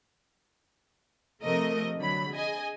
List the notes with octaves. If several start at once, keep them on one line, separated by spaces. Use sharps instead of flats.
C3 F3 A3 A#4 D#5
D3 F#3 B5
G#4 D#5 G#5